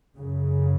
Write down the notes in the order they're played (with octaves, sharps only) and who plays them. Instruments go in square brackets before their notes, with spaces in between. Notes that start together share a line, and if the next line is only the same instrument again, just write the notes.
[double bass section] F#2 C#3